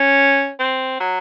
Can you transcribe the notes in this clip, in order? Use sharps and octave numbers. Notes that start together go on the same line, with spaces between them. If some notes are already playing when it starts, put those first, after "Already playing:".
Already playing: C#4
C4
F#3